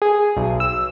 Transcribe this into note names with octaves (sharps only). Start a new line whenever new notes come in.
G#4
B1
E6